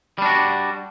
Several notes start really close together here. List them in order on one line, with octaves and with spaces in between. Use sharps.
G3 D4 F#4